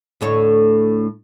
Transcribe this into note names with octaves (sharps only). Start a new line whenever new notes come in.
D2 A2 C#5